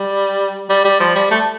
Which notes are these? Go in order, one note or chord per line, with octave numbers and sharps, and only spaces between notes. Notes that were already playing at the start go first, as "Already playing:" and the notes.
Already playing: G3
G3
G3
F3
G3
A3